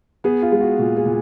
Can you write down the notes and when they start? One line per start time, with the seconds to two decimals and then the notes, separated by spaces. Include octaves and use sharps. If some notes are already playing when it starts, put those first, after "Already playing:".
0.24 B3 G#4
0.42 F4
0.52 G#3
0.61 F#4
0.79 A#2 F#4
0.96 G#4
1.06 A#2